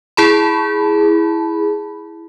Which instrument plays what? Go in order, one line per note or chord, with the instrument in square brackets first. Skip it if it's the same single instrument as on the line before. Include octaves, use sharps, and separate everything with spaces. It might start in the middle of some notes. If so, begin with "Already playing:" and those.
[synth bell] E4 G#4 A5 B5